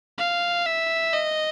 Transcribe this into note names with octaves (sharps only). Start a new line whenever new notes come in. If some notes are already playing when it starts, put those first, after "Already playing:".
F5
E5
D#5